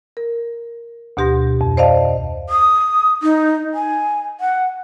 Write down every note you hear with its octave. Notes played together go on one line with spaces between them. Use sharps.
A#4
D2 B2 G4 C6 A#6
F2
C5 D5 D#5 F5 A5
D#6
D#4
G#5
F#5